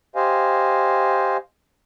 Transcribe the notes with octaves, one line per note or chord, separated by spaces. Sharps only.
G4 C5 D#5 F5 G#5